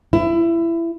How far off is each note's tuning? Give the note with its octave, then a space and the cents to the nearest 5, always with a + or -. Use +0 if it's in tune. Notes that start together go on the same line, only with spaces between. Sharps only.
E4 +20